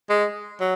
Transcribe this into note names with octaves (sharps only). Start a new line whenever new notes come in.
G#3
F#3